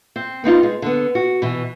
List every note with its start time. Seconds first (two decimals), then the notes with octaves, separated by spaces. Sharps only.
0.16 C4
0.44 B3 C4 D#4 F4
0.63 G#3
0.82 D3 B3
1.15 F#4
1.42 B2 E3